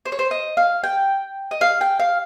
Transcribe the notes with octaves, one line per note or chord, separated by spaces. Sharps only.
C5
C#5
C5
D#5
F5
G5
D#5
F5
G5
F5